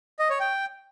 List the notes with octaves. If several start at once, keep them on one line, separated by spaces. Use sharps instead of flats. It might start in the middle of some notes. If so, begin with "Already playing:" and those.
D#5
C#5
G5